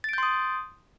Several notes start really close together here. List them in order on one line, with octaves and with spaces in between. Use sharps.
A6 D7 G6 C6 D#6